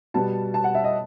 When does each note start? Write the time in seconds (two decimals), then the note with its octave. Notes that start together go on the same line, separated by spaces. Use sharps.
0.14 B2 G3 B3 A5
0.54 A5
0.64 F#5
0.75 E5
0.84 D#5